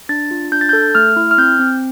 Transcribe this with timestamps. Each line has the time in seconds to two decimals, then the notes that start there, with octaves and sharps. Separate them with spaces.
0.09 D4 A6
0.31 F4
0.52 D4 G6
0.61 A6
0.69 G6
0.73 A4
0.95 A3 F6
1.16 E4
1.31 F6
1.38 C4 G6
1.59 C4